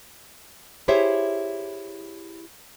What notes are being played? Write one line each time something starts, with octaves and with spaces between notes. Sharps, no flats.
E4 G4 G#4 C5 C#5 E5